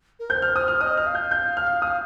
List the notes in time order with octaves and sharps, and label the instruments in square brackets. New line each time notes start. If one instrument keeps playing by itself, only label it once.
[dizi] A#4
[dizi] C5 [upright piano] G6
[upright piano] F6
[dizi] C5 [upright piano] D#6
[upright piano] F6
[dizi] D#5 [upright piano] D#6
[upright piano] F6
[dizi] F5
[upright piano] G6
G6
F6
D#6